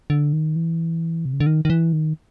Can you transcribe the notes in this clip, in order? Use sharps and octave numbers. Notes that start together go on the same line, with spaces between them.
D3
D#3
E3
C3
C#3
D3
D#3
D#3
E3
D#3